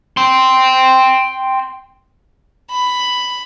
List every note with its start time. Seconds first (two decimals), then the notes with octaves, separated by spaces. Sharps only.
0.17 G5 C6
2.70 B5